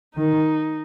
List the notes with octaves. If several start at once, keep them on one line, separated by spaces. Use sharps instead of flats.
D#3 D#4